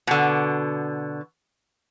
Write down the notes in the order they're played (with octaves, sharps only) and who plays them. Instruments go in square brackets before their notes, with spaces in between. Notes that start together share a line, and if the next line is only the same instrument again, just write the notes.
[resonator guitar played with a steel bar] B2 D3